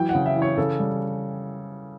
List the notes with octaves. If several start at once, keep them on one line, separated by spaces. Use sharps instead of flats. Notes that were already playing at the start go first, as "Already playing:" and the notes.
Already playing: E3 F#3 G5
F#5
C#3
E5
E3
C#5
C#3 A4
G3